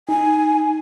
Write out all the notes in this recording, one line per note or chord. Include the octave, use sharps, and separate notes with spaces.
D#4 G#5